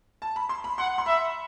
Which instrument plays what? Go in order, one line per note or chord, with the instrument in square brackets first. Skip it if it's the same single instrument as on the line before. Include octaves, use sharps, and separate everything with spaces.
[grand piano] A5
B5
C6
B5
[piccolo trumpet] F#5 [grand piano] C6
[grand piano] C6
[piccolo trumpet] E5 [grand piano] B5